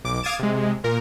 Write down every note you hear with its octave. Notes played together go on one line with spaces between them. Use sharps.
B1 D6
F5 D6 D#6 G#6 A6 E7
C3 G#3
A#2 A#4